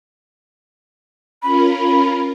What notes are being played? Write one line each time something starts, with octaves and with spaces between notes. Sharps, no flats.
C#4 F4 A#4 B5